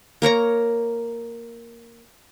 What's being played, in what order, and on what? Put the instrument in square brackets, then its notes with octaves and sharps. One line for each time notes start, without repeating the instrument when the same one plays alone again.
[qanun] A#3 A#4 C#5 A#5